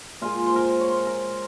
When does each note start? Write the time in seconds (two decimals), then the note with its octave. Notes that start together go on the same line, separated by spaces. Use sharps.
0.21 A#2 G#3 F4
0.47 C5
0.56 A#4
0.80 C#5
0.89 C5
1.07 A#4